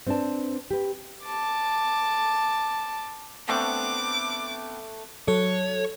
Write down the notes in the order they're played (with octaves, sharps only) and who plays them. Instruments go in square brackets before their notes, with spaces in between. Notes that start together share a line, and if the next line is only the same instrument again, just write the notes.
[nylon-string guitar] C4 D4 B4 D5 A5
G4 B4
[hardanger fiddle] A5 D6
[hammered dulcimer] A3 [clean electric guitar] B3 C4 D4 [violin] D6
[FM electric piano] F#3 A4 [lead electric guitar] C#5